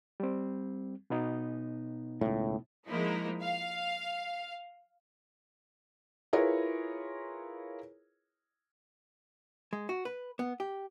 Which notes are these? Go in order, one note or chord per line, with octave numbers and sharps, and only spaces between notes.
G3 C4
B2 B3 D#4
C#2 A2
F3 G#3 A#3 D#4 E4 A#4
F5
E4 F4 G#4 A#4 B4 C#5
G#3
F#4
B4
B3
G4